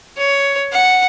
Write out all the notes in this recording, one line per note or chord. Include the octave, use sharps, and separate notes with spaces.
C#5
F#5